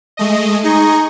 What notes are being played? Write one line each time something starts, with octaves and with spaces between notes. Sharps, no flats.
G#3 A3 D#5
D#4 G#4 D#5 C#6